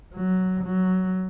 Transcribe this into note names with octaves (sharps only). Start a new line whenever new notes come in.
F#3
F#3